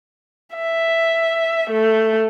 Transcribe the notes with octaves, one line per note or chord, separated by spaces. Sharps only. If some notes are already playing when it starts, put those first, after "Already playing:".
E5
A3